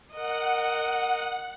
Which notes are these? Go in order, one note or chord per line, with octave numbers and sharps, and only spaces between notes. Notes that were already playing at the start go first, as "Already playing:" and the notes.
A#4 D#5 F#5